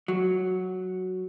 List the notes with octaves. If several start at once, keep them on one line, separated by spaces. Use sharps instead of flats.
F#3